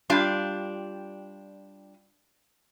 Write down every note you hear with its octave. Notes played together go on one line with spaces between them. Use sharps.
G3 D4 F4 G4 F5